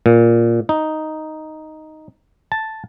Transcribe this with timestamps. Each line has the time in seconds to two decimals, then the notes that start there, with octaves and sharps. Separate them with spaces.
0.06 A#2
0.69 D#4
2.52 A5